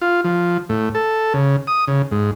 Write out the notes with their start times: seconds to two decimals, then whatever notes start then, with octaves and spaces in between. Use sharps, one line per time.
0.01 F4
0.24 F3
0.69 A2
0.95 A4
1.34 C#3
1.67 D#6
1.88 C#3
2.11 G#2